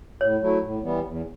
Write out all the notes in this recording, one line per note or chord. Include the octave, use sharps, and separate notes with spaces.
A2 C#5
F#3 A3 E4
A2
E3 G3 B3
E2